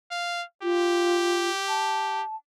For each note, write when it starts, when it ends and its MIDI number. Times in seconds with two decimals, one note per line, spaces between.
0.11 0.43 77
0.63 1.49 65
0.63 2.22 67
1.68 2.36 81